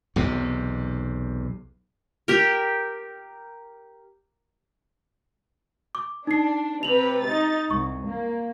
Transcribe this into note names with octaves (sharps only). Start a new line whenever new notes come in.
B1 E2 C3
G4 A#4
D6
D4 D#4 C7
C3 B4 F7 F#7
D#4 A6
C2 C#6
A#3